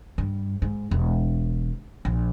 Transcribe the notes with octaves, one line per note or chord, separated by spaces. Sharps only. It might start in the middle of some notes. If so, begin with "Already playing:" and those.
G2
G#2
E1
A#1